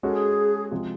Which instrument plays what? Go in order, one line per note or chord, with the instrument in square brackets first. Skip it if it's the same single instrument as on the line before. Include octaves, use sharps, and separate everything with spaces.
[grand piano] G#3 C#4 F#4 A4 [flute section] G#4
[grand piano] C3 F3 G#3